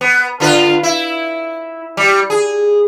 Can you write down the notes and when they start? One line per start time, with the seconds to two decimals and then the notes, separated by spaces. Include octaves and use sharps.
0.01 B3
0.40 D3 F4 B4
0.83 E4
1.97 G3
2.30 G#4